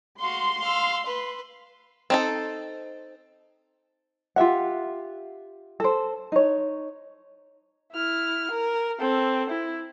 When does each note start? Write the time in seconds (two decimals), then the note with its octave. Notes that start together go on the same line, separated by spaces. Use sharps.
0.20 F#4 F5 C6
0.60 F5 E6
1.06 B4
2.10 C4 D#4 A4
4.36 F4 G4 E5 F#5
5.80 A4 C5
6.32 D#4 C#5
7.93 E4 F6
8.51 A#4
9.00 C4 A4
9.49 E4